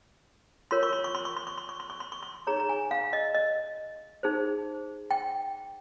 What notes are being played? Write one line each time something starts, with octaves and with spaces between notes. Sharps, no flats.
F4 A#4 C#5 C6
C#6
C6
C#6
C6
C#6
C6
C#6
C6
C#6
C6
C#6
C6
C#6
C6
D#4 G#4 C#5 A#5
A#5
G#5
F5
D#5
D#5
D#4 G#4 C5
G5